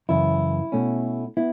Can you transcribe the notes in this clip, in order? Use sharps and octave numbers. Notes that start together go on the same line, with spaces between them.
F#2 C#3 E3 E4
B2 A3 C#4
B3 E4